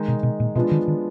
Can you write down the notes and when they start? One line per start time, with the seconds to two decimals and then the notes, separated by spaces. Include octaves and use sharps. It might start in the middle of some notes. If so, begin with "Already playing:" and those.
Already playing: D#3 G#3 D#4
0.08 B2
0.23 B2
0.40 A#2
0.55 B2 F3 G#3 B3 D4 F4
0.71 D#3
0.88 D#3